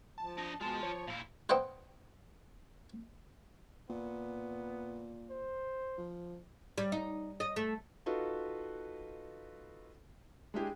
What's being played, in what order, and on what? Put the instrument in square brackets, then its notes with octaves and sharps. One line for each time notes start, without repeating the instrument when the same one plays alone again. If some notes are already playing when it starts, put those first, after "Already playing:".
[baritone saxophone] F3 [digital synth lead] A5
[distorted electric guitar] D4 D#5
[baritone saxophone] B2 [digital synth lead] G#3 [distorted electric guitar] F4 A5
[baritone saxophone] F3 [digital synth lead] C#5
[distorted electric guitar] A#2 E4 [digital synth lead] F5
[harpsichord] B4 C5 D#5 E5 F#5 G5
[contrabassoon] A#2 [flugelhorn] B3
[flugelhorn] C5
[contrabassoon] F3
[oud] G3
D#4
D#5
A3
[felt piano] D#4 F4 F#4 A4 B4 D#5
G#3 D4 E4 G4 G#4